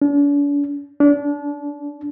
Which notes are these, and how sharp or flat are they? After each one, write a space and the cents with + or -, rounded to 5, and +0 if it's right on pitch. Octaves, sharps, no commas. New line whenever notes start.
D4 -45
D4 -30